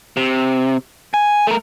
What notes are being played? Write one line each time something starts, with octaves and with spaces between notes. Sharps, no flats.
C3
G#5
A3 A#4